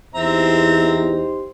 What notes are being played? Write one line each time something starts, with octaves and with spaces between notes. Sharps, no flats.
E2 C4 D#4 G4 C5 E5 A#5